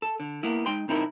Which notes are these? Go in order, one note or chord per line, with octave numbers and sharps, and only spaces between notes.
A4
D3
A#3 B3 E4
G#3 D#4 G5 C6
B1 C4 D#4 E4 A#4